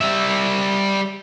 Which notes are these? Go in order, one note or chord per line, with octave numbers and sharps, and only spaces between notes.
G3 E5